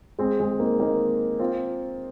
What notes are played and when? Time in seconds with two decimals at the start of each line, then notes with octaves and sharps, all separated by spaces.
0.19 G#3 C4
0.40 G#3 C4
0.59 A#3 D#4
0.80 A#3 D#4
1.39 C4 F4